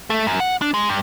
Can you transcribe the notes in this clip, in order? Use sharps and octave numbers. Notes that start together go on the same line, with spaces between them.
A3
F#2
F#5
D4
G#3
G2